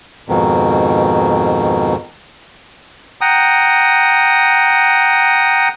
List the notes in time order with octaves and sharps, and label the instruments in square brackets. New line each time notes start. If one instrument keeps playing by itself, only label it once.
[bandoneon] F2 G#2 B2 D#3
F#5 G5 A#5 D#6